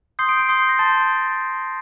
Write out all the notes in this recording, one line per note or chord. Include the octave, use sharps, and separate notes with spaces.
C6 D#6 G6 C7
D7
D7
C6 D#6 G6 C7
C7
A#6
A5 C6 G6 A6
G6